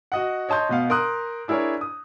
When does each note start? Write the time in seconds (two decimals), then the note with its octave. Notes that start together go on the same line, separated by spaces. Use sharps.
0.12 F#4 D#5 F#5
0.49 C#5 D#5 A5 C6 G6
0.69 B2 B3 F5
0.90 A#4 C6 D#6 F#6
1.48 D4 E4 G#4 A#4 C#5
1.81 D#6